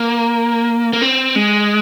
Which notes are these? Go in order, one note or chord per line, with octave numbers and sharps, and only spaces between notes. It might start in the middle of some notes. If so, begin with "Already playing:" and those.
Already playing: A#3
A#3
C4
G#3